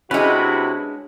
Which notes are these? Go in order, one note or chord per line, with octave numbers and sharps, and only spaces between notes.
C3 G#3 C#4 D4 E4 F#4 B4